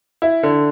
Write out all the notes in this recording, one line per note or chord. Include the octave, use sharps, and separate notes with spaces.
E4
D3